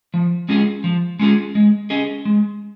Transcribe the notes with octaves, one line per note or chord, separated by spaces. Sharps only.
F3
G#3 C#4 F4 G#4
F3
G#3 C#4 F4 G#4
G#3
C#4 G#4 D#5
G#3